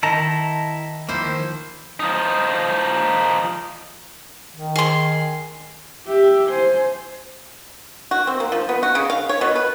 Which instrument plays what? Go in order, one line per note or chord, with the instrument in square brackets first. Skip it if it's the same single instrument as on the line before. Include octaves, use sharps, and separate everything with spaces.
[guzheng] D#3 [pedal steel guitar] E4 A5 A#5
[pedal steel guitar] D#3 F3 A#3 [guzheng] E4 C5
[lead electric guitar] F3 D#4
[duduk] D#3
[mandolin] G#4 C6
[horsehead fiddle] G4 E5
C5 G#5
[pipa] F#4
C4
A#3
F3
B3
F#4
C#3
F5
C#5
B2
B4